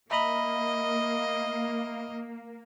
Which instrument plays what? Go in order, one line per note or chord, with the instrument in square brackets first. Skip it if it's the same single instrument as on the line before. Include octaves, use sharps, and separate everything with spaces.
[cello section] A#3 [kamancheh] D#5 [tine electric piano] E5 A#5 B5